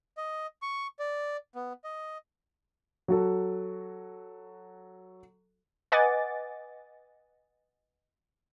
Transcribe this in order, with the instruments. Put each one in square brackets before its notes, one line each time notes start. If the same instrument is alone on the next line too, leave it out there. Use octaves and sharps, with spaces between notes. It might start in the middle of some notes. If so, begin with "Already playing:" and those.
[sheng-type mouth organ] D#5
C#6
D5
B3
D#5
[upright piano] F#3 F#4 A4
[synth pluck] B4 D#5 F#5 G#5 D6 A6